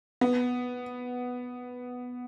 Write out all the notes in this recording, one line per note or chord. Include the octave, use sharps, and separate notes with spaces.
B3